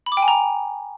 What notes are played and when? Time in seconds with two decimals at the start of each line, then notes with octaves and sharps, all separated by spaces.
0.06 B5
0.12 D6
0.17 G5
0.22 G#5
0.28 A#5